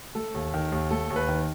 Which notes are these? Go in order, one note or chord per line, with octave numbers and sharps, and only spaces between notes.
A3 A4
D#2
D#3
D#2
A3 A4
D#2
B4
D#3